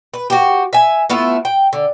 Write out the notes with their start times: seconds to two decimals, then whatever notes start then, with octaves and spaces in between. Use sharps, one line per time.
0.14 B4
0.30 F#4 G4
0.73 E5 G#5
1.10 A3 B3 E4 F4
1.45 G5
1.73 D3